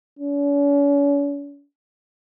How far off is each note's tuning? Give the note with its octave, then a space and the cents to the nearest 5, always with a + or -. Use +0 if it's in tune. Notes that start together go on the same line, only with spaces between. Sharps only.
C#4 +45